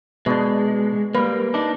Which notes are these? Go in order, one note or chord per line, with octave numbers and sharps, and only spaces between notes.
B2 G#3 D4
G3 A#3 B4
D4 D#4